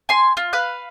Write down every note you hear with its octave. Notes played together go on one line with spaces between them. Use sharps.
G#5 C6
F4
B4 F5 F#6